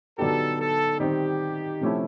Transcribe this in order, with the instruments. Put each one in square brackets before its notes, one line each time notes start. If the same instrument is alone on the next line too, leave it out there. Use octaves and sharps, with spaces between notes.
[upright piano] D3 F#3 B3 D#4 G4 [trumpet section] A4
[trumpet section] A4
[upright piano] D#3 G3 C4 D#4 [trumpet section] G4
[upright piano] C3 F3 A3 C#4 E4